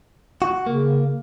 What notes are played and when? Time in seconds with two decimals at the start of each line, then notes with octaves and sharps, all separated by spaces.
0.42 F#4
0.67 C#3 A#3